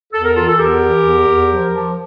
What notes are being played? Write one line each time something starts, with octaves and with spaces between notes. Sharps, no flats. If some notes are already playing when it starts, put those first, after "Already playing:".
E2 A4
A#4
E3 F4 A4
A4
E2 G4 A#4
E3
E2
E2
F3
F3